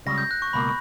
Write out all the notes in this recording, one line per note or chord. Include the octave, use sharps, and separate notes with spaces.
C#2 C#3 G3 A#6
G6
F#6
C#6
C#2 B2 A#3 B5